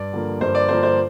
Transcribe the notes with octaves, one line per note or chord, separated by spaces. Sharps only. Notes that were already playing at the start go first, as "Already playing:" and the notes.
Already playing: G2 D5
D3 F3 A#3
G2 C5
D5
D3 F3 A#3 C5
C5